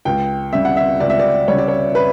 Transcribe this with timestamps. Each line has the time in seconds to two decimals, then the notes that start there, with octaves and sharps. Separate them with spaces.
0.05 C#2 G5
0.53 C#3 G3 E5
0.65 F#5
0.77 E5
1.00 C#2 D5
1.10 E5
1.19 D5
1.48 C#3 G3 C#5
1.58 D5
1.68 C#5
1.95 B4